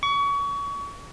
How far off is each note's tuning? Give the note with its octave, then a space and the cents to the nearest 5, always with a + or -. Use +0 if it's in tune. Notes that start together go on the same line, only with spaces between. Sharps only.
C#6 +30